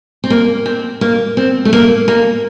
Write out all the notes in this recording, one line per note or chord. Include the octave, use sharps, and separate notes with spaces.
C4
A#3
C4
A#3
C4
A3
A#3
A#3